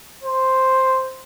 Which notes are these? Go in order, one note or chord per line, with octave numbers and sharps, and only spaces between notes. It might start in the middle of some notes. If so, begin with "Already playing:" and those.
C5